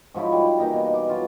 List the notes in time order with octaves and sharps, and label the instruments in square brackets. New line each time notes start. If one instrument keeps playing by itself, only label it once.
[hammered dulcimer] G#2 F3 F#3 E4
G3
E3 A#3 D#4 A#5
B2
D6
F#3 F4